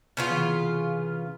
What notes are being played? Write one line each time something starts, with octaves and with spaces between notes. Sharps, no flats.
C#3 B3 F4
C3 E3